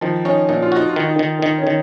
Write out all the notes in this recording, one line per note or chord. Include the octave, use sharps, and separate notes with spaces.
D#3 F3
C#4 D#4
A#2 D#4
F4
D#4 F#4
F4
D#3
D#4
D#3
D#3 D#4
C#4
D#3